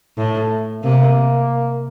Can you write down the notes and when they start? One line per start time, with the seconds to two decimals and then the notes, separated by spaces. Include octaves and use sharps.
0.18 A2 A3
0.83 C3 A#3